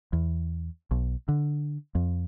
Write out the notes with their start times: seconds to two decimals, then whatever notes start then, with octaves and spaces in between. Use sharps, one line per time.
0.13 E2
0.91 B1
1.28 D3
1.95 F2